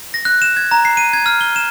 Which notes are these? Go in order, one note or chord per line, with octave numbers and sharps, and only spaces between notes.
A#6
F#6
E7
G#6
A#5
C7
D#7
G#6
F6
G7
E7